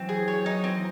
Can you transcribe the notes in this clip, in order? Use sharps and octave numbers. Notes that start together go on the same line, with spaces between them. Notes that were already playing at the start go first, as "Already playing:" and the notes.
Already playing: E3 F#3 C4
G#4
C#5
D#4
C4